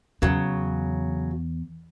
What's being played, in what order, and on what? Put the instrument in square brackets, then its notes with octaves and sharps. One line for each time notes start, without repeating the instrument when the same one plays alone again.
[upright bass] E2 [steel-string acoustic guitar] C#3 F#3